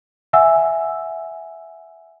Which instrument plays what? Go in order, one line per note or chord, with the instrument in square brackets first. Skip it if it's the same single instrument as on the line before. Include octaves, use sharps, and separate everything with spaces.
[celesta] E5 F#5 G#5 E6